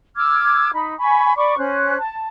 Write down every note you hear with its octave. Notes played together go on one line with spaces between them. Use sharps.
D6 E6 F6 G#6
D#4 B5
G#5 B5 C#6
D5 B5 C#6 D6
C#4 C5 F#6
A5